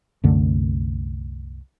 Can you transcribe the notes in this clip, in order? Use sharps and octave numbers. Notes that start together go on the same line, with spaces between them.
C2 F#2 D3 A3